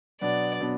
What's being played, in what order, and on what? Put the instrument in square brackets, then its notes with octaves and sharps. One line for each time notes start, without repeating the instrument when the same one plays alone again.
[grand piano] B2 F#3 B3 D4 [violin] D5
[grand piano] B2 F#3 B3 D4